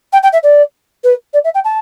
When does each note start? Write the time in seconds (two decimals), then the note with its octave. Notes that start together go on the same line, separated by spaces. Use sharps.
0.12 G5
0.23 G5
0.32 E5
0.43 D5
1.04 B4
1.33 D5
1.44 E5
1.54 G5
1.64 A5